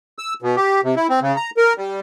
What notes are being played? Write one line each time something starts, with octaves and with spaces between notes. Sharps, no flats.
E6
B2
G4
C3
E4
C4
C#3
A#5
A#4
G3